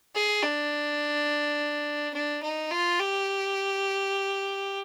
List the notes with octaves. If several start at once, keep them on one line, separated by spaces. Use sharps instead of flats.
G#4
D4
D4
D#4
F4
G4